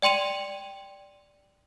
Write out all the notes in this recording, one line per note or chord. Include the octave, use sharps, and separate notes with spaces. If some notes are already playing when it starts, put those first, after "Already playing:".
D5 G5 C6 D#7 F7